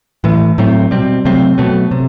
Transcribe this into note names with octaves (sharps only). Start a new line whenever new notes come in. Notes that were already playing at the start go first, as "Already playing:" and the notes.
A2 E3 A3
A2 F#3 A3 C4
B2 G3 C4
C3 F#3 A3 C4
B2 F#3 A3
C3